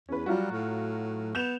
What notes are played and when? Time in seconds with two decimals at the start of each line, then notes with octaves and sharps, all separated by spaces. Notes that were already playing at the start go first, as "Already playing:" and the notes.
0.09 E2 C#4 B4
0.26 F#3 G3 F4 F#4
0.51 A2
1.35 B3 G6 E7 F7